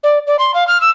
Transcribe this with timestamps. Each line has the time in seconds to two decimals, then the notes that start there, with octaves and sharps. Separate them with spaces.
0.03 D5
0.27 D5
0.39 C6
0.54 F5
0.67 F6
0.80 E6